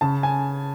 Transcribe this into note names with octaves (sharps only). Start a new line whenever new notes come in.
C#3 A5
G#5